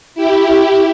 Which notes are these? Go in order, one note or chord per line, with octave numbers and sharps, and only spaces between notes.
E4 G4